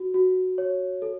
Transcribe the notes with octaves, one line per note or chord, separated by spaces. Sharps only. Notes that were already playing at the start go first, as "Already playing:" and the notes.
Already playing: F#4
F#4
C#5
A4